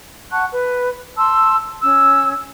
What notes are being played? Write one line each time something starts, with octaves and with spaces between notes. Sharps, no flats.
F#5 A5 C#6 F#6
B4
A5 C6 E6
C#4 E6